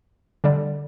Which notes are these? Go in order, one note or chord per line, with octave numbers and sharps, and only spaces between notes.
D3 G3